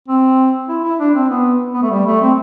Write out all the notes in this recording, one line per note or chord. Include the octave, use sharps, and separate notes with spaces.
C4
E4
E4
D4
C4
B3
B3
A3
G3
A3
C4